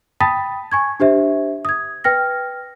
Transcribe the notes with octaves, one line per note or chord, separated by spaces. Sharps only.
G5 A5 B5 D#6 A6 B6
G#5 C#6 G#6
D4 G4 C5 E5
D#6 G#6
B4 G5 F6 A#6